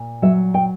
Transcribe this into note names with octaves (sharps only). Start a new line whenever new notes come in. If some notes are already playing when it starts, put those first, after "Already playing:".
Already playing: A#2
F#3 E5
G5